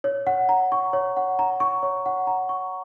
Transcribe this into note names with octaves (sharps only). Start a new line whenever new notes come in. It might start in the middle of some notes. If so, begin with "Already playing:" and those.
C#5
F#5
A#5
C#6
C#5
F#5
A#5
C#6
C#5
F#5
A#5
C#6